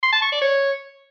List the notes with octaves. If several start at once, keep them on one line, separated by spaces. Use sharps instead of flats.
C6
A5
C#6
D5
C#5